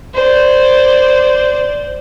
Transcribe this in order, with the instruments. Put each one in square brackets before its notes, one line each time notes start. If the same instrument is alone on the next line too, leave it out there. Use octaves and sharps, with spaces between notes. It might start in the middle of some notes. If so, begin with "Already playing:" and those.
[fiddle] C5 D5